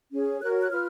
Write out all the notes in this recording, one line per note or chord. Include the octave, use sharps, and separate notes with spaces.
C#4 G#4 C#5
F#4 A#4 C#5 F#6
F#6
F4 B4 F6